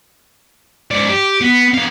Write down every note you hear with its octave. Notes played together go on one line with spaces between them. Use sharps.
G#2 D5
G4
B3
B3 F5